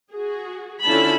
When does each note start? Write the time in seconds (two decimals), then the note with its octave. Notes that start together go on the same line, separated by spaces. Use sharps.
0.13 F#4 G#4
0.84 D3 C#4 E4 F4 A5 B5